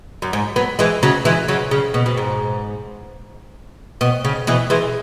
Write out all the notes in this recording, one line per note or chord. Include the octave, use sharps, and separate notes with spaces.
F#2
G#2
F#3 B3
E3 G#3
C#3 F#3
E3 G#3
C#3 F#3
C#3
B2
B2
G#2
B2
C#3
B2 E3
E3 G#3